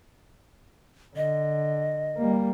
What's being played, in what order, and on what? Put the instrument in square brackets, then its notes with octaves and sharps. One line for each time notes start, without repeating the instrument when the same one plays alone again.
[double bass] D3 [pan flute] D#5
[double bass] G3 A#3